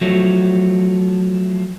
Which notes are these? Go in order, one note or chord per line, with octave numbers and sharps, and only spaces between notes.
F3 F#3 A3